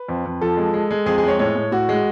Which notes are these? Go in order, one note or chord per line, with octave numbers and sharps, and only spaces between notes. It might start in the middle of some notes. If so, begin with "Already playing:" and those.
Already playing: B4
F2
F2
F3 A4
G#3
G#3
G#3
F2 G#4
G#4
G#3 C#5
A2 C#5
A2
A2 F#4
G#3